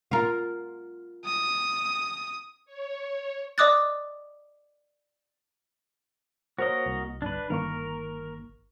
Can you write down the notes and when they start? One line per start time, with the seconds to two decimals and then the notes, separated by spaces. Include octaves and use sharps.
0.11 F4 A#4
1.25 D#6
2.66 C#5
3.58 D5 D#5 D6 D#6 F#6 A6
6.59 A#3 F#4 A#4 C5 C#5 D#5
6.86 C2
7.22 G1 D4 B4
7.50 G1 D#3 A#3 A#4 C#6